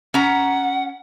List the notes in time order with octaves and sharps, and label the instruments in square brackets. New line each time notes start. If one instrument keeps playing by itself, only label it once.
[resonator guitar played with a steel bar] C#4 A#5 [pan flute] F#5